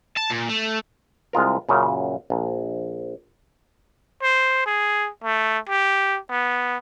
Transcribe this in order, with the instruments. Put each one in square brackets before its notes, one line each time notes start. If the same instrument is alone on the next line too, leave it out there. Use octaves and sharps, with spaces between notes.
[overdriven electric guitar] A5
A#2
A3
[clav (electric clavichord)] C2 G#3 F4 A#4
F#2 A#2 C#3
A#1
[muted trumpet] C5
G#4
A3
G4
B3